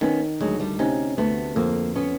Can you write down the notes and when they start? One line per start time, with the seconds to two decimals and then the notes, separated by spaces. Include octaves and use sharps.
0.01 D#3 B3 C#4
0.40 D2 F#3 G#3
0.60 G3 A3
0.79 C3 C#4 D#4
1.18 D2 A3 B3
1.56 F2 A#3 C4
1.95 B3 C#4